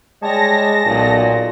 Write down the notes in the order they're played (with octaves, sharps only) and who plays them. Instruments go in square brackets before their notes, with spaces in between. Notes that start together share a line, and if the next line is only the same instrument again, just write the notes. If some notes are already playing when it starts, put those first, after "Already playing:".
[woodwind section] G3 C#5 D#5 [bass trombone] G#3 [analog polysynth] A5 A#6
[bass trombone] B1 [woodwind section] A#2